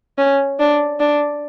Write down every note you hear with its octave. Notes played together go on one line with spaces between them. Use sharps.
C#4
D4
D4